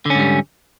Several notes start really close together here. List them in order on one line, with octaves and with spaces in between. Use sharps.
D3 C#4 G#2 G3